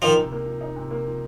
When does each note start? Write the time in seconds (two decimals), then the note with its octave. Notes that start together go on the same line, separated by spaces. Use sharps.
0.02 D#3 F3 D#4
0.17 C3
0.32 A#3
0.46 F3
0.61 D#4
0.76 C3
0.90 A#3
1.05 F3